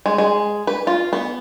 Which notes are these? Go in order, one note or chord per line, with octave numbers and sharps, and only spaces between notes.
G#3
G#3
B4
F4
B3